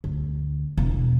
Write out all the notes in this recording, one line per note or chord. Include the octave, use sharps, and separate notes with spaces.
D2
E1